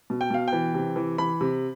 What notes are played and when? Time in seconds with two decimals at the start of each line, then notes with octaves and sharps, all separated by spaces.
0.10 B2
0.21 G5
0.31 B2 F5
0.48 E3 G5
0.74 C3
0.96 E3
1.18 E3 B5
1.41 C3